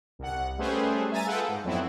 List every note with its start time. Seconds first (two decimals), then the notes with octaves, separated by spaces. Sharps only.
0.19 C2 F#5
0.58 G3 A3 C#4 G#4 B4 C5
1.12 E5 G#5 A#5 A6 D#7
1.26 F4 G#4 A4 B4 F#5 G5
1.48 G#2
1.64 F2 F#3 B3 C4 E4